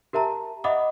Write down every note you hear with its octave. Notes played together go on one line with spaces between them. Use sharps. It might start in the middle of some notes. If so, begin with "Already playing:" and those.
G4 A#4 E5 A5 A#5
D#5 E5 F#5 B5 D6 D#6